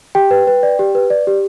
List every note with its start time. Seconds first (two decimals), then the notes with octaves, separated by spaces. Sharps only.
0.15 G4 G5
0.31 B4
0.47 B4
0.63 D5
0.79 G4
0.95 B4
1.10 D5
1.27 G4